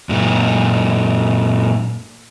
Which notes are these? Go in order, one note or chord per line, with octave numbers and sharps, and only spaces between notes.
F#2 A#2